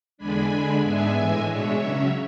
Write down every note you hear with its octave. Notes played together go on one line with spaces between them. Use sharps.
E2 D3 G#3 D4 G#5 B5
D3 G#3 D4
G#2 G#3 B3 D4 E5 G#5
A2 E3 G#3
B2 G#3 D4 C#5 E5
C#3 F#3 C#4